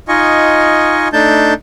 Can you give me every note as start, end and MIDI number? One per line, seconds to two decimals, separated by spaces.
0.08 1.08 63
0.08 1.08 65
0.08 1.08 75
0.08 1.08 80
0.08 1.08 85
1.13 1.54 57
1.13 1.54 62
1.13 1.54 63
1.13 1.54 81
1.13 1.54 91